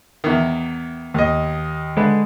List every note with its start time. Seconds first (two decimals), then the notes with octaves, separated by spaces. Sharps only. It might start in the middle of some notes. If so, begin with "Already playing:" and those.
0.24 E2 D#3
1.14 D#2 D#5
1.97 D3 G#3 B4